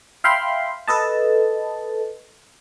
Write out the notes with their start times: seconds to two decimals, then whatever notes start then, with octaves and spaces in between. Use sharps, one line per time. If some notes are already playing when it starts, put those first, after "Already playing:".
0.24 E5 F5 G5 B5 C6
0.88 A4 B4 D#5 A5